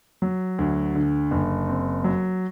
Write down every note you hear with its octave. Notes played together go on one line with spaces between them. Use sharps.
F#3
D2
D3
F#1
C4
F#3